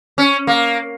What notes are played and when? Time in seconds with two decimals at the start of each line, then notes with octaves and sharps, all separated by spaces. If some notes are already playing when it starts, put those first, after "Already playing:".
0.18 C#4
0.47 A#3